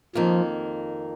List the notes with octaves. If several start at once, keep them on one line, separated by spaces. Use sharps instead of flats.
F2 D#3 F3 A#3